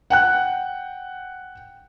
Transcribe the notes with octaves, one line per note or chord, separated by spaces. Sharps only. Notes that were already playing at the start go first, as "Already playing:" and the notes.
F#5 G5 F#6